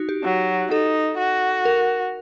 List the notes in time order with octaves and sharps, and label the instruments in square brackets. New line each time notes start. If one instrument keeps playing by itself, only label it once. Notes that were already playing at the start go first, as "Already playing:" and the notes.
Already playing: [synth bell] D#4 F#4
G4
[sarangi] F#3
[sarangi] D#4 [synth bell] A4
[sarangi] F#4
[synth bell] A#4